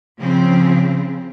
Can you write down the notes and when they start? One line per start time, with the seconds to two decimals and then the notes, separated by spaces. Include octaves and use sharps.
0.19 C#3 F3 C4